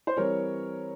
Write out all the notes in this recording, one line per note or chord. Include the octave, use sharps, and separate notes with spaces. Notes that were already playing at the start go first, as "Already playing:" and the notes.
C5
E3 G3 C4 A#4 C#5